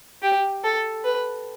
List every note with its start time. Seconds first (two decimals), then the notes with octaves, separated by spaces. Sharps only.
0.23 G4
0.64 A4
1.05 B4